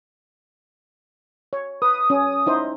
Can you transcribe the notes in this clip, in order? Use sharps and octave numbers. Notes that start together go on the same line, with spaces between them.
C#5
B4 D#6
C#4
D#4 E4 C5